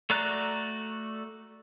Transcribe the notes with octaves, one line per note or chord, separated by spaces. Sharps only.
A3 F#4 D5 A#5 F#6